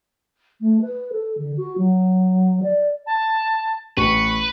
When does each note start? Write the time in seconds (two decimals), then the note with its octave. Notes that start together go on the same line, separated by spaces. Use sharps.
0.60 A3
0.81 B4
1.12 A4
1.37 D3
1.57 F#4
1.77 F#3
2.62 D5
3.06 A5
3.97 A1 B4 C#6